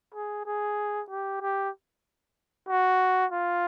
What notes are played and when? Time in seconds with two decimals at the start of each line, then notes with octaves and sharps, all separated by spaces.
0.14 G#4
0.46 G#4
1.10 G4
1.41 G4
2.69 F#4
3.32 F4